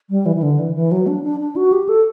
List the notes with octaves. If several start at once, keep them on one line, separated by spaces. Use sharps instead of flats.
G3
E3
E3
D3
E3
E3
F#3
D4
D4
D4
F#4
G4
A4